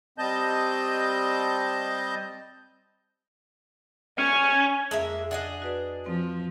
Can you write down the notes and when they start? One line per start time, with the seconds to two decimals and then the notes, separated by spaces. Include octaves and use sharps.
0.18 G3 C4 D#5 A5 G6
4.19 C#4 G#5
4.91 F2 G#3 A#3 E5
5.31 D4 G#4 D#5 F#5
5.62 F#4 B4 D5
6.06 F3 C4